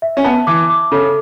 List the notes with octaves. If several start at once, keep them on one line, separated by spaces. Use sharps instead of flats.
E5
C#4
B3 A5
E3 D6
D6
C#3 A4